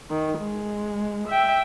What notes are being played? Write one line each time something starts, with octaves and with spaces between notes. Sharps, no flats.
D#3
G#3
E5 G5